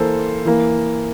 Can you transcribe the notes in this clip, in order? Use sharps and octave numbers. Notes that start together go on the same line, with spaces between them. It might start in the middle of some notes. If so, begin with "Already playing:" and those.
Already playing: E3 A#3 A4 C5
E3 A#3